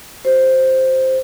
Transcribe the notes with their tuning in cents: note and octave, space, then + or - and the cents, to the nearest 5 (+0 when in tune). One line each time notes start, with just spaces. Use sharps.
F#4 +45 C5 +0